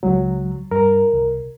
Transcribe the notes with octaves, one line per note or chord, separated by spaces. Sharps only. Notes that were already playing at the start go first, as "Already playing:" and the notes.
C#2 F#3 G#3
G2 A#4
C2